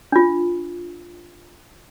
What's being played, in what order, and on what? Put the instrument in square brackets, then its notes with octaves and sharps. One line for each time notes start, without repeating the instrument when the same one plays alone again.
[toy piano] D4 F4